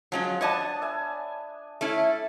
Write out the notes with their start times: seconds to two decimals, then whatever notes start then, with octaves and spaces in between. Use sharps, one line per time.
0.12 F3 F#3 G#3 C#4
0.41 B3 D4 C#5 D#5 A5
0.82 E5 G#5
1.81 A3 C#4 E4